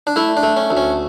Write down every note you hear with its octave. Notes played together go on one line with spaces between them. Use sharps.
D4
A3 E4
D4
A3
C#4
D2
C#4